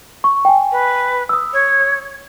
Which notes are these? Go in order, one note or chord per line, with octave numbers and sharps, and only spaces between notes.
C#6
G5 G#5
B4
D#6 E6
C#5